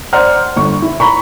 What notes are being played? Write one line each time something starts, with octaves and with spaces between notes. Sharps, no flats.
C5 D5 F#5 A#5 F6
G1 C#6
E4
A#5 B5 C#6